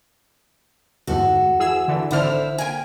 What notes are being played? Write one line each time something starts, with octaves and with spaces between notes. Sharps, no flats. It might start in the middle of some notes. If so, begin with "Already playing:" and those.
G1 E2 G#2 F#4 A4
E3 G#4 E6
D3 E3
G#1 D3 E4 C5 F6
A#3 G5 G#5